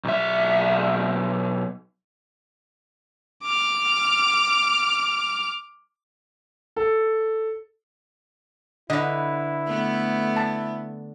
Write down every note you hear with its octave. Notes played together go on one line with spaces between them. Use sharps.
B1 E5
D6 F6
A4
D3 E4 B4 D#5
A3 B3
A5